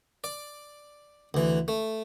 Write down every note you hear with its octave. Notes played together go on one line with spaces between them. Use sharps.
D5
D2 E3
A3